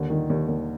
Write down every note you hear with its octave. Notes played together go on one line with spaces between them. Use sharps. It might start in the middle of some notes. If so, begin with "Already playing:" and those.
Already playing: D#2 D3
D#3
D#2
D#2